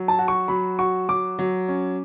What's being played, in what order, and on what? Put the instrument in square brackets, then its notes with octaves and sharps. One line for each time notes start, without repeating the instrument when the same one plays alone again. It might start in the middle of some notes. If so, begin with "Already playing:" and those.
Already playing: [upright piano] F#3
[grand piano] A5
[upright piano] F#4
[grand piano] C#6
[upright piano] F#3 [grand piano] B5
[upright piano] F#4 [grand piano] C#6
[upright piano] F#3 [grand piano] D6
[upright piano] F#3
C#4